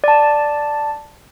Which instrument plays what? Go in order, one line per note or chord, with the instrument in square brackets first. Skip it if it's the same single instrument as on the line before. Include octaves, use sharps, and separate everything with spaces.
[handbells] D5 A5